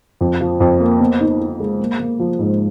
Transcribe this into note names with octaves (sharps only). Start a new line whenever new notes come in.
F2
F3
F2
A#3
B3
D#4
D#4
G#3
A#3
A#3
F3
G#2